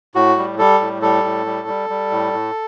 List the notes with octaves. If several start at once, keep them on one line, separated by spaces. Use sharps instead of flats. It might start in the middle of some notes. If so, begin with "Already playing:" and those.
A2 F#4
G3
G3 A4
A2
G3 A4
A2
G3
G3
G3
A2
A2